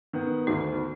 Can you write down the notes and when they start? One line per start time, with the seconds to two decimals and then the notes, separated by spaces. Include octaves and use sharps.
0.13 D#3 B3
0.47 D2 D#4